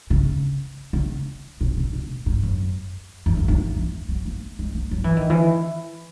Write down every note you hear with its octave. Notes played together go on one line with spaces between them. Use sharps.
C#3
C#3
B2
C#3
B2
G#2
F#2
E2
F#2
D#3
E3
E3
F#3
A#3
G#3
A#3
F#3
E3
D#3
E3